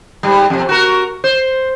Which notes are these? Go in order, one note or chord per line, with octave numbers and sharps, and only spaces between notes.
G#2 G3
F2 C3
F#4 A#4
C5